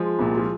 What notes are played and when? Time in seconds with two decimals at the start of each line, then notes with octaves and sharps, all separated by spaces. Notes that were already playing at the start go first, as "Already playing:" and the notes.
Already playing: F3 G#3
0.19 C2 A#2
0.38 F3